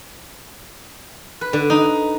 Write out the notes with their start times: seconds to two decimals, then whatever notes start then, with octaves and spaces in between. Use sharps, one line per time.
1.41 B4
1.53 D3
1.70 D#4